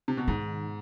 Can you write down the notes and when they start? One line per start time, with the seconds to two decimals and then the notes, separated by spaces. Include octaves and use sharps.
0.08 C3
0.17 B2
0.27 G#2 D#3